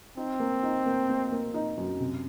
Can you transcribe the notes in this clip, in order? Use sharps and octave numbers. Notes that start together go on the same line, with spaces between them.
C4 D#4
A#3
D#4
A#3
A#3
A#3
D#4
F#2
C3